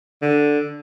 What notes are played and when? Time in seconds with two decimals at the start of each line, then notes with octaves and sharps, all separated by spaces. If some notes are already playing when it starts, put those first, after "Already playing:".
0.22 D3